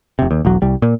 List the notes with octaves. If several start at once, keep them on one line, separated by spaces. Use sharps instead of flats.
F1 C3
D#2
E1 B1 F#3
C2 G3
A#2